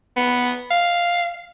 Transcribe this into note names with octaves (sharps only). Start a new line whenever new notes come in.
B3
F5